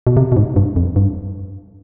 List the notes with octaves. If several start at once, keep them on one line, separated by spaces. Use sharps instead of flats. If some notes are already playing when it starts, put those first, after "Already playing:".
B2
C3
B2
G#2
G2
F2
G2